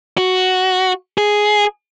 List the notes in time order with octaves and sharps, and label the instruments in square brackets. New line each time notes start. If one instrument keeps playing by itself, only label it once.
[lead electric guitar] F#4
G#4